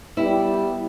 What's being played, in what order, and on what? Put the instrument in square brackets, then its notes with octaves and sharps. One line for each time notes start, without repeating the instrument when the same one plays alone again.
[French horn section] G3 B3 [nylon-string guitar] E4